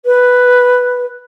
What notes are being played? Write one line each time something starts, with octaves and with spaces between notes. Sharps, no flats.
B4